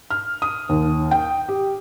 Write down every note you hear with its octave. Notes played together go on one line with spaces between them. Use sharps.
F6
D#6
D#2
G5
G4